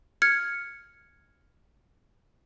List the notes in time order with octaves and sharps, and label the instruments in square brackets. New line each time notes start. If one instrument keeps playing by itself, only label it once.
[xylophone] F6 G#6 C#7